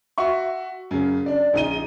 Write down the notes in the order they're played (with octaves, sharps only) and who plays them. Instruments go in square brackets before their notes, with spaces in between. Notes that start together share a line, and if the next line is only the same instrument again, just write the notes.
[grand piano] F#4 E5 C#6
F#2 C#3
D4 D5
A#1 C#3 D#4 D#5 D#7 G7